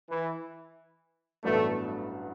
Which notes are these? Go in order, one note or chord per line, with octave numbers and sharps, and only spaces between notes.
E3
A1 G2 F#3 A3 B3 D4